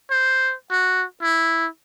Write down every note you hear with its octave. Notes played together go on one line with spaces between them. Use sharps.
C5
F#4
E4